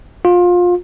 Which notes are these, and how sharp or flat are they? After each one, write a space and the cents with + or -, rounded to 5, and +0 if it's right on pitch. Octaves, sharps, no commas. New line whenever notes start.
F4 +25